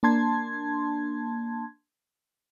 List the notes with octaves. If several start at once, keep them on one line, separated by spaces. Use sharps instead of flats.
A#3 D4 A5 C6 G#6